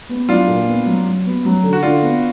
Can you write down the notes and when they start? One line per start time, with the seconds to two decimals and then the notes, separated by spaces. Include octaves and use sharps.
0.09 B3
0.28 F#3 D4 F4
0.48 A#2
0.68 B3
0.86 F#3
1.06 F#3
1.26 B3
1.45 F#3
1.63 D3
1.73 F#4
1.82 D3 D4 F4
2.02 B3